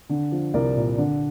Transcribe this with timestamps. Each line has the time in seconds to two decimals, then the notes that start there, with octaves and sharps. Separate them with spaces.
0.09 D3
0.32 F3
0.54 C2 A#4 D5
0.76 A#2
0.98 D3